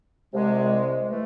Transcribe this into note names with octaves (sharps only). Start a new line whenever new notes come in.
C2 C3 G#3
E3 A3